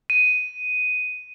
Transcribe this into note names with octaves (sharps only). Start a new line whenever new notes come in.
D#7